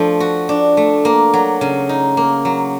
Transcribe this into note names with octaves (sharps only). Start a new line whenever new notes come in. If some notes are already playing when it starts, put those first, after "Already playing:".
Already playing: F3 A3 D4
F#4
D4
A3
A#3
F#3
C#3
D#4
A#3
F#3